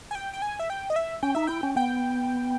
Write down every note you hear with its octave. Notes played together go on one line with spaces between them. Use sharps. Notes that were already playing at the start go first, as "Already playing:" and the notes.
G#5
G5
G5
G#5
E5
G5
D#5
E5
C#4 G5
D#4 E5
E4 G5
C#4
B3 G5